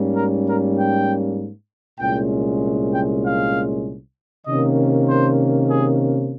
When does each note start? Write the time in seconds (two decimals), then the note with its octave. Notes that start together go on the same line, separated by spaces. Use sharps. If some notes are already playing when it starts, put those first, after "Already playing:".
Already playing: G#2 G3 A#3 C#4
0.15 A#4
0.46 A#4
0.76 G5
1.99 C2 A#2 G#3 C#4 G5
2.91 G5
3.23 F5
4.45 C3 D#3 A#3 C#4 D#5
5.07 C5
5.68 G#4